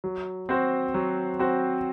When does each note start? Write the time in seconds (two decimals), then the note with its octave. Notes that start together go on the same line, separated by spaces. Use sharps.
0.04 F#3
0.49 C4 F#4 C5
0.94 F#3
1.39 C4 F#4 C5